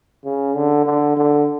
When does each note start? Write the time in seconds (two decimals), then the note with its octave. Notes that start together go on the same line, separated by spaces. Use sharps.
0.25 C#3
0.55 D3
0.86 D3
1.17 D3